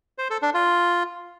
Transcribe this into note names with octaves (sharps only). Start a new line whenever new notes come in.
C5
A4
D4
F4